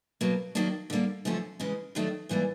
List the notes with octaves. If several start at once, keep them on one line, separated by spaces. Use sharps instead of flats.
B2 F#3 A#3
D#3 F#3 A#3 D4
D3 G3 A#3
F#2 D3 F3 A3 C#4
C#3 E3 G#3 C#4
F#2 D#3 F#3 A3 D4
G#2 E3 G3 A#3 D4